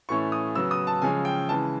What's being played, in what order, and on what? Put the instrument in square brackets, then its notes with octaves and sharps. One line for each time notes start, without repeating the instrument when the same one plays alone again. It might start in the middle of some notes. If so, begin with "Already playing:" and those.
[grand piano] A2 E3 A3 C#4 C#6
D#6
C#3 F#3 B3 E6
D#6
A5
C#3 F3 G#3 C#4 G#5
G5
C#3 E3 G#3 A5